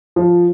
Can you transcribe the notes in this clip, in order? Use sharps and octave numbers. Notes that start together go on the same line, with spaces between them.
F3